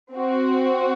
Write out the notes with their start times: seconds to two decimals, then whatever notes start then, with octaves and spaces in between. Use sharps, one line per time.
0.13 C4 F#4